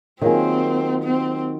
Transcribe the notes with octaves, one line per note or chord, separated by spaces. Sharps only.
D#3 F#3 A#3 C4 F4 G#4
C4